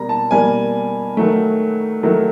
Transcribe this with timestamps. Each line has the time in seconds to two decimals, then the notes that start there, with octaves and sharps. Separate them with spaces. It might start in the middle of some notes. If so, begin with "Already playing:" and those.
Already playing: B2 G3 A#3 A#5
0.09 A5
0.31 B2 G3 A#3 G#5
1.17 D#3 F#3 A3
2.03 D#3 F#3 A3